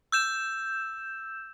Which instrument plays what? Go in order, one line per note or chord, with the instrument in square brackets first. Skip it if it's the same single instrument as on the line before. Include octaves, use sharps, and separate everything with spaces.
[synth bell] E6 G6 E7